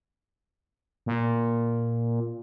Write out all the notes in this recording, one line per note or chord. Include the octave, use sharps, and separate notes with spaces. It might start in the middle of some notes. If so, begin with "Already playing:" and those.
A#2